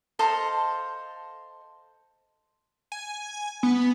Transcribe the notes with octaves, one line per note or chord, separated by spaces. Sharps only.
A4 C5 D#5 F5
G#5
B3